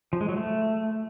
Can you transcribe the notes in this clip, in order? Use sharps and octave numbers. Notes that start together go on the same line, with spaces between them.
F3
G#3
F#3
A3